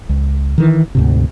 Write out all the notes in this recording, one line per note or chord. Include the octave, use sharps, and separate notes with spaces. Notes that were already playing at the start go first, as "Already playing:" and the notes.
C#2
D#3 E3
D2 G#2 C3